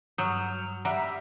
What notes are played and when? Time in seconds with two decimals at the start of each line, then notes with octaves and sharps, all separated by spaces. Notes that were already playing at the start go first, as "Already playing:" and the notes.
0.18 G2 F#3 D#6 F6 G6
0.85 G3 E5 F#5 A#5